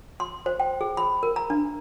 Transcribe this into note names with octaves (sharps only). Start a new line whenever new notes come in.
C6
C5
G5
G#4
B5
A#4
A#5
D4